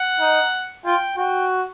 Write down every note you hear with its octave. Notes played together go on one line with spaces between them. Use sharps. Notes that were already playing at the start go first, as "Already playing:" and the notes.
Already playing: F#5
D#4
F4 G5
F#4 G5